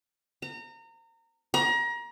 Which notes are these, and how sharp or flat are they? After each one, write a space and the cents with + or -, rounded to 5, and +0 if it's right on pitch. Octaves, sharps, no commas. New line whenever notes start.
A#5 -30
A#5 +30